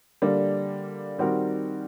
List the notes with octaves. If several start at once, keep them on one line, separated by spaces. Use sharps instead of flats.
D3 G3 A#3 D4
D#3 G3 C4 F#4 A#4